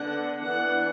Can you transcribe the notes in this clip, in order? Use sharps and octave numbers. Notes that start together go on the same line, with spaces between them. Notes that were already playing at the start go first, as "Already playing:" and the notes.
Already playing: D3 B3 D4 F#5
E3 B3 D4 F#5